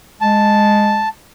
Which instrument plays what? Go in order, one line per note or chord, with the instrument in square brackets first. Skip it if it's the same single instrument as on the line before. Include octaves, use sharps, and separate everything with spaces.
[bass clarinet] G#3 [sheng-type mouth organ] A5